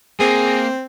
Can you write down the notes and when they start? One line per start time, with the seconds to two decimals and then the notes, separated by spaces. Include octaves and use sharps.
0.20 A#3 C4 G#4